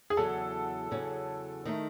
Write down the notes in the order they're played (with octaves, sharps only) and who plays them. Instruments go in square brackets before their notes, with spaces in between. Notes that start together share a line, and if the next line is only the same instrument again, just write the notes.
[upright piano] G#4
[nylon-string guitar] E2 C#3 F#3 C#4 [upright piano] A4
[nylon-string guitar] E2 C#3 F#3 C#4
D#3 A3 D#4